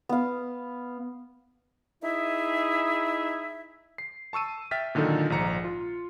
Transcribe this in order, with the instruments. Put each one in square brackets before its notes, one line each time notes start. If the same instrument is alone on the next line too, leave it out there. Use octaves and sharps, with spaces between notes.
[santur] B3 F5
[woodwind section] D#4 E4 G#4 E5
[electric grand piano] C7
A5 C#6 E6 D#7
E5 G5 F6 A6 B6
A#2 D3 D#3 F#3 D#4 A4
A#1 G#2 A#5 C#7
F4